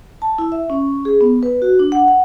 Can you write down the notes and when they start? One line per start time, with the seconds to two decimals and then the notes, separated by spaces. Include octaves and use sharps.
0.22 A5
0.38 E4
0.52 E5
0.70 C#4
1.05 G#4
1.21 B3
1.43 B4
1.62 F#4
1.79 D4
1.92 F#5
2.08 F#5